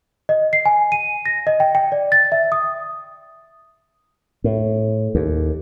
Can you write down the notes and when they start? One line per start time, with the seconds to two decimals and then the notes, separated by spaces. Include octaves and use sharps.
0.29 D#5
0.53 C7
0.66 G#5
0.92 D#7
1.26 A#6
1.47 D#5
1.60 G5
1.75 G5
1.92 D5
2.12 A6
2.32 E5
2.52 D#6
4.44 A2
5.15 D#2